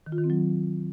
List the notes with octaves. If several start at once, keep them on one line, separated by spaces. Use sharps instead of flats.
D#3
F4
D#3
C4
F#3